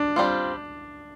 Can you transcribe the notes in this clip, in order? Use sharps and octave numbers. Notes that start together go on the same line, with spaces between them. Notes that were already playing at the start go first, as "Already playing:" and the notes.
Already playing: D4
G3 C4 F4